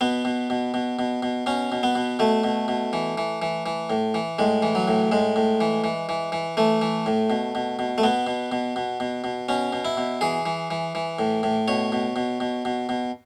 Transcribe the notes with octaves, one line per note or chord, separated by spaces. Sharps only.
B2 B3
B2
B2
B2
B2
B2
B2 C#4
B2
B3
B2
B2 A3
B2
B2
E3
E3
E3
E3
A2
E3
A2 G#3
E3
F#3
A2
A2 G#3
A2
E3
E3
E3
E3
E3 A3
E3
A2
B2
B2
B2
A3
B2 B3
B2
B2
B2
B2
B2
B2 C#4
B2
E4
B2
E3 G#4
E3
E3
E3
A2
A2
B2 C#5
B2
B2
B2
B2
B2